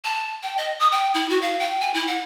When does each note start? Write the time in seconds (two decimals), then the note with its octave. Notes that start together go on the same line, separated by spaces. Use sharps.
0.04 A5
0.43 G5
0.58 D#5
0.80 D#6
0.92 G5
1.14 E4
1.30 F#4
1.42 F5
1.60 G5
1.81 G#5
1.94 E4
2.07 F#5